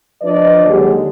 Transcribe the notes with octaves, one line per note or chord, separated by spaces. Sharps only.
F3 D4 B4 D5 D#5
D#2 D3 F#3 G#3 G4